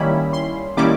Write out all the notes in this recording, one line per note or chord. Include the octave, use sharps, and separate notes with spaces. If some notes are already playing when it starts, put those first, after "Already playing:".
Already playing: D#3 G3 A#3 C#4 E4 B5
C6
D#3 G3 A#3 C#4 E4 D6